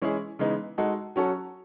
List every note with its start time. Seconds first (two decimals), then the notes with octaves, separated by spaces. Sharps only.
0.02 E3 G#3 C#4 E4 G#4
0.39 C#3 E3 G#3 B3 D#4
0.78 G#3 D#4 F#4 A4
1.16 F#3 C#4 F#4 A4